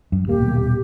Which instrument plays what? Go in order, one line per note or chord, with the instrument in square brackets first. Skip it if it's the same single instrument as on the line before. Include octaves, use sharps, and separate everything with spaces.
[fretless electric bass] F#2
[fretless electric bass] D#1 A#3 [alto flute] G4
[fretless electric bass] D#1 B2